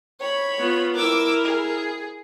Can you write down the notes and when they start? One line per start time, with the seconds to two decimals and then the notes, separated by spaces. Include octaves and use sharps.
0.20 C#5 B5
0.59 B3 F4
0.95 E4 A#4 D6 E6
1.44 G#4